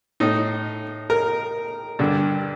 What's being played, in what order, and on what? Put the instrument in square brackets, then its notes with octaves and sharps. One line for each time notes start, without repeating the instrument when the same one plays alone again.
[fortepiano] A2 D#4
A#4
G2 D3